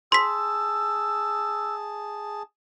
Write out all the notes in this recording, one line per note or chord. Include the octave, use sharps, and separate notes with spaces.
G#4 A5 C6 E6 B6